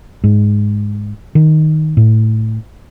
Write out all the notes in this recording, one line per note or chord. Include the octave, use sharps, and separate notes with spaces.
G#2
D#3
A2